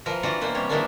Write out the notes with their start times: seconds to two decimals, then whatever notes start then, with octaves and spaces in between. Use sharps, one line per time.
0.06 E3 F3 A#4
0.23 E3 D4 F4 F#4 F#5
0.41 B2 E3 A#3 C5 F#5
0.54 C3 E3 G3 C#4 C#5
0.69 D#3 E3 F#3 G#3 A#3 D4